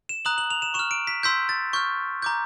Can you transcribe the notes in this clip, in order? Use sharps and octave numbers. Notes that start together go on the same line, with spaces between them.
E7
A#5 D#6 F#6 F#7
F#7
F7
E7
C#6 E7
F6
D7
B6
C6 E6 G6 B6
A6
C#6 F6 G6
A#5 D6 G6